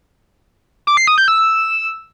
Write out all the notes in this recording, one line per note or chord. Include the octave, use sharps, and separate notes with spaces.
D6
C7
D#6
G6
E6